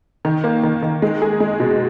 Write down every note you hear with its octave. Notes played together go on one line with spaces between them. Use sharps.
D#3
A#3
D#3
D#3
G#3
G#4
G#3
B2